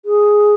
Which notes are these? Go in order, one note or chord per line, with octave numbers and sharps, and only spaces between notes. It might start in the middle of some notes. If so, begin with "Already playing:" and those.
G#4